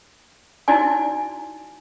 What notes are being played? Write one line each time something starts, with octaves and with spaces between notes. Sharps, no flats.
D#4 E4 F#4 D5 G#5